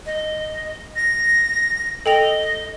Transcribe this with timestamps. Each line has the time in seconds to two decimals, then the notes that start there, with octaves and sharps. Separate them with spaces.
0.06 D#5
0.96 A#6
2.06 A4 D#5 G5 F7